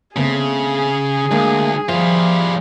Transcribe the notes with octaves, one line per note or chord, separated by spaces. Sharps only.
C#3 A3 B3 C4 G#4
D2 G#3 A#3 D4
F3 G3 F4 C5 E5